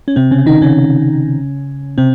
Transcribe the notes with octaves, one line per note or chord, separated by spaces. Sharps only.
C#4
C3 C4
C#3 C#4
D#3 D#4
C#3 C#4
C3 C4